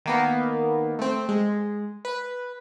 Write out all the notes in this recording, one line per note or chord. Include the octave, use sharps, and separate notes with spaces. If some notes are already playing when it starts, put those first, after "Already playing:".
D#3 A#3 B3
A3 C4
G#3
B4